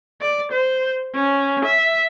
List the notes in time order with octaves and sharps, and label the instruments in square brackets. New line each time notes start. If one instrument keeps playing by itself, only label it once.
[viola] D5
C5
C#4
E5